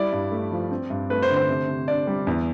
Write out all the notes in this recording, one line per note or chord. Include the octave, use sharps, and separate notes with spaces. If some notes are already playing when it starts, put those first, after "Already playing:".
Already playing: G3 E4 D5
G2
A3
F3
C4
G2
A3 B4
C5
D3
C5
C3
C3
D4 D5
G3
E2